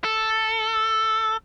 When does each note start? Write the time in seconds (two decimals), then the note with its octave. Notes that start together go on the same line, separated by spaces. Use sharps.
0.04 A4